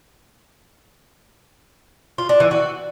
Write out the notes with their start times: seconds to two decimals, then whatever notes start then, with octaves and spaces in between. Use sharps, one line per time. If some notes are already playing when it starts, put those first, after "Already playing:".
2.18 F4
2.29 D4
2.40 E3
2.51 F#4